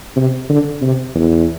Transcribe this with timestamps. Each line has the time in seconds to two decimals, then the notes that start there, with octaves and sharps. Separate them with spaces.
0.16 C3
0.49 D3
0.82 C3
1.15 E2